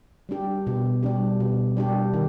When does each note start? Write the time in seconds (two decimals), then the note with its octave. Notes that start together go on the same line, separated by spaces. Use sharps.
0.29 G3 D4 G4
0.67 B2
1.03 G3 D4 G4
1.40 B2
1.77 G3 D4 G4
2.14 D#3